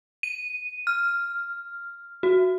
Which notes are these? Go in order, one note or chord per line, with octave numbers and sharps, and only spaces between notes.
D#7
F6
F#4